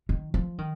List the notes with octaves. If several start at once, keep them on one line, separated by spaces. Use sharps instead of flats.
D#3
F3
D#3